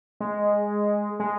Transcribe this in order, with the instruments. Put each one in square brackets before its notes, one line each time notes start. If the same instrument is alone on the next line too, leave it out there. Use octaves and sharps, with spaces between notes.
[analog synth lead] G#3
G#3